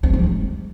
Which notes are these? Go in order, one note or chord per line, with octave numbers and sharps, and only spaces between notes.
C4
F3
G#3